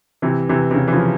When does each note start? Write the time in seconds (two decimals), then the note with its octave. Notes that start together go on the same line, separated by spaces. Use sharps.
0.22 C3 E3
0.49 C3 E3
0.71 C3
0.75 C#3
0.88 E3
0.92 C#3 F3